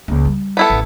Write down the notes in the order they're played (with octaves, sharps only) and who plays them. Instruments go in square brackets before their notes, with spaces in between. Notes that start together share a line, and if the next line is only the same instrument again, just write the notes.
[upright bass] C#2 A#3
G3
[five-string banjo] B3 E4 A4
[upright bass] A1